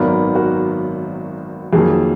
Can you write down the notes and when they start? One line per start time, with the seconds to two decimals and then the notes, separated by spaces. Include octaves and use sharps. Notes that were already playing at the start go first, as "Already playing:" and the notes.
Already playing: G#1 F#2 D#3 F#3 B3 A#4 D5
0.35 F#4 A#4
1.73 F2 D#3 F#3 A#3 G#4